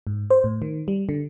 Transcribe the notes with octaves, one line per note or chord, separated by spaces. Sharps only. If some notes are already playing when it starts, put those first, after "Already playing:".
G#2
C5
A2
D#3
G3
D3